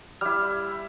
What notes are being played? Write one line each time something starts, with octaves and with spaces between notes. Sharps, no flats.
G3 E4 F6